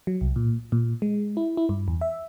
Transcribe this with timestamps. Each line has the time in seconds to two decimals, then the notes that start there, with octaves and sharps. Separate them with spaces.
0.07 F#3
0.21 C2
0.36 A#2
0.72 A#2
1.02 G#3
1.37 E4
1.57 E4
1.69 G2
1.88 E2
2.01 E5